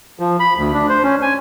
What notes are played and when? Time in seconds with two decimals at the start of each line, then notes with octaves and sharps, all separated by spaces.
0.20 F3
0.40 B5
0.58 D2
0.74 D4
0.89 C5
1.04 C#4
1.22 G#5